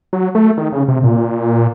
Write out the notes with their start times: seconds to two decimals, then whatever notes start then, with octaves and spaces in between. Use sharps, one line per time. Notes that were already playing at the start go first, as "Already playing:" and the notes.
0.13 F#3
0.35 A3
0.58 D#3
0.73 C#3
0.88 C3
1.03 A#2